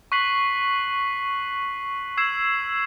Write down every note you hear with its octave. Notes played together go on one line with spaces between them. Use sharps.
C#6 F#6 B6 C7 F#7
E6 G#6 C7 E7